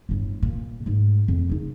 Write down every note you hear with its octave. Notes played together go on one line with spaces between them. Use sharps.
G1 A2
A#2
G#2 A3
F2
C#3 D#4